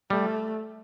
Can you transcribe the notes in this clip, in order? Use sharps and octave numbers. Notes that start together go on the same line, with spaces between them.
G3 A3